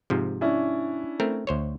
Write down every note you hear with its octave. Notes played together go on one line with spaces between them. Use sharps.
G#2 C3 F3
C#4 D4 E4
A3 C4 A#4
D2 C5 C#5